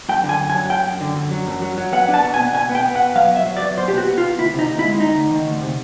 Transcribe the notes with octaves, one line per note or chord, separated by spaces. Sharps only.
F#2 G5
D3
G#5
F#2
G#5
F#3
F#2 G5
F#2
D3
F#2
F#3
F#2
F#3
F#3
B3 F#5
D4
A5
B2
G#5
B3
B2 G#5
B3
G5
B3
F#5
B2
F#3 F5
B3
E5
F#3
D5
F#3
B2 C5
G4
B3 F#4
B3
F4
B2
D2 E4
C3
D#4
D2
E4
G#3
D2 D#4
D2
D#3
D2
C3